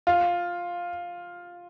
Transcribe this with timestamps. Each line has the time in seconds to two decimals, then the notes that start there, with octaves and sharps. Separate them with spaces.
0.07 F4